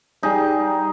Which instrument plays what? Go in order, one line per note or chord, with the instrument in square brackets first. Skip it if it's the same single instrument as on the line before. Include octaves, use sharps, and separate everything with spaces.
[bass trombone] G3 [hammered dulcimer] D#4 G#4